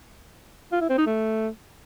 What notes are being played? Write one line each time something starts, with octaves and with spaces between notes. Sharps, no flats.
F4
E4
C4
D#4
A3